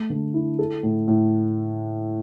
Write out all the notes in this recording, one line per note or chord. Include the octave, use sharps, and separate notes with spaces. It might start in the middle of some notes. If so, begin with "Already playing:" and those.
Already playing: A3
D3
E4
A4
A2
A2